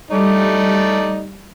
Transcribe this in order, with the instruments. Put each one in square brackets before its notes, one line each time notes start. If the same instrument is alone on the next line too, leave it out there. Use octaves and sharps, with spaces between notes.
[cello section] G3 [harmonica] A3 D#4 D5